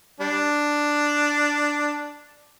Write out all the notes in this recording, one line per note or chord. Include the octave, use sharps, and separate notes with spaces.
G3 D4